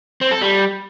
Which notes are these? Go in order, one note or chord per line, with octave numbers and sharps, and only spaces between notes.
C4
A4
G3